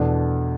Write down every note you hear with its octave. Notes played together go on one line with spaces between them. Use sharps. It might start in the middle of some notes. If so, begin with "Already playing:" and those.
Already playing: E2 B2 A3 D4